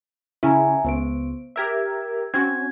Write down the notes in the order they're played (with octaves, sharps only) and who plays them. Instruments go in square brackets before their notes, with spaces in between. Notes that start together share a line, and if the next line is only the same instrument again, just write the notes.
[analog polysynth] C#3 C#4 E4 [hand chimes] E5 G#5 A#5
[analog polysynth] C#2 [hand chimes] B3 C5 D7
[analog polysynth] G4 A#4 E5 [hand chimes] E6 G#6
[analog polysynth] C4 C#4 F#4 [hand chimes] G#6